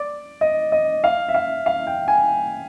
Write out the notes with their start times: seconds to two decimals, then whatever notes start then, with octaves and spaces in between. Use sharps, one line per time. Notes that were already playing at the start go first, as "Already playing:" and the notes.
Already playing: D5
0.41 D#5
0.72 D#5
1.04 F5
1.29 E5
1.34 F5
1.66 F5
1.87 G5
2.08 G#5